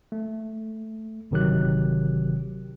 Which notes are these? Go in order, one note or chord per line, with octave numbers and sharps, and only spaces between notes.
A3
G1 C3 D#3 F#3 G4 F#6